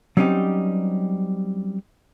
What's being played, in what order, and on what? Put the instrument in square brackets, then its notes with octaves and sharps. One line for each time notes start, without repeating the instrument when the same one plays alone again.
[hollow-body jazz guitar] F#3 G3 C4 C#4 D#4 G4